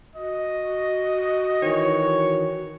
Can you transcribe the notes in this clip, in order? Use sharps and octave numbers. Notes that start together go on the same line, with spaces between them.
F#4 D#5
D#3 E3 C#5